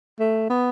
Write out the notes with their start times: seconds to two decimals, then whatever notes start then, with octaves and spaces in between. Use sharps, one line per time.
0.20 A3
0.50 B3